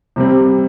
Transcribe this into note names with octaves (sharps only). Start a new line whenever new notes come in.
C3 G3 C4